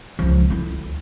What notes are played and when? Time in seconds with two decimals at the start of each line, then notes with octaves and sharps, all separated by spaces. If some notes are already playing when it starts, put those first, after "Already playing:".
0.19 C#2 F3
0.50 D2 E4